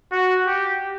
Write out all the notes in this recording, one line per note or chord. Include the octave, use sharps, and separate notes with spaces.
F#4
G4